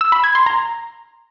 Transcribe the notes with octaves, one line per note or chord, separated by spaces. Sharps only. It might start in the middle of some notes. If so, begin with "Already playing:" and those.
E6
B5
G#6
C6
A#5